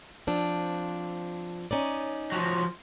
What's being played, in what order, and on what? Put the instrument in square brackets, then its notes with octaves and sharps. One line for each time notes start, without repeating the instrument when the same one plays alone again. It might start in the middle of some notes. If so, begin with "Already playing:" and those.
[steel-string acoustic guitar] F3 C4 D4
C#4 D#4 D5
[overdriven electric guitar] F3 F#3